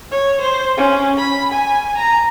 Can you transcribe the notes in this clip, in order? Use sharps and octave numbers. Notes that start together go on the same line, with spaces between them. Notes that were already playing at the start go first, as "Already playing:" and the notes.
C#5
C5
C#4
B5
G#5
A#5